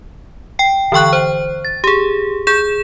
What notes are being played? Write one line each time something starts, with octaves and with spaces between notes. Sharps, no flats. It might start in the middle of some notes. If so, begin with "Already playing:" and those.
G5 C7
D3 E3 G5 C#6 F#6
C5
A6
G4 G#4
G#4 G6 E7